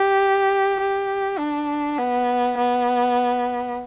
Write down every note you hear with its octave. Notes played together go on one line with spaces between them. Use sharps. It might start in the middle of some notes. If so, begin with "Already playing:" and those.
Already playing: G4
G4
D4
B3
B3